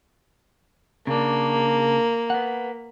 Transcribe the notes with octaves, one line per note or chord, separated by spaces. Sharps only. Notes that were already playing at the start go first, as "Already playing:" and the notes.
C#3 A#3 D4
B4 F#5